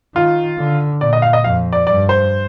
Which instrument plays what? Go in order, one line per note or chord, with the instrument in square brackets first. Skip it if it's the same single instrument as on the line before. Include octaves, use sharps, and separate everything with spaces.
[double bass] D#3 [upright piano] F4
[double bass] D3
[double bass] A#2 [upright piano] D5
[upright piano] D#5
F5
D#5
[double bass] F2 [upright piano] F5
[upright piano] D5
[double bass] G2 [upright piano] D5
[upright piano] C5